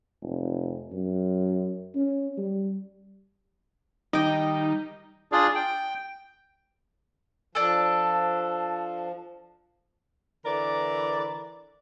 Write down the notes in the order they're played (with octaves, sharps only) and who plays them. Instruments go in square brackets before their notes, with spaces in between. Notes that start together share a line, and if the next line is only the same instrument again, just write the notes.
[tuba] F1
F#2
C#4
G3
[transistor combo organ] D#3 G3 [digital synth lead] D#4 [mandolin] D#5 G5
[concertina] D4 F4 G#4 D5
G5
[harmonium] F3 [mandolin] D4 A4
[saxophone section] D3 E3 A#4 D5